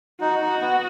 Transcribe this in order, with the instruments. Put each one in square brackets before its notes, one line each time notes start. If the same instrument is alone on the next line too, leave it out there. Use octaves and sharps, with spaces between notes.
[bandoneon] D#4 [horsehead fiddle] F#4
[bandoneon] D#4
B3